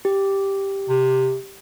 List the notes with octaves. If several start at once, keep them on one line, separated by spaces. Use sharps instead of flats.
G4
C3